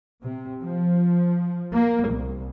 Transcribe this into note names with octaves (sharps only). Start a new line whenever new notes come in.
C3
F3
A#3
C2